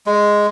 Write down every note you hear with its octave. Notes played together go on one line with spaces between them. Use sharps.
G#3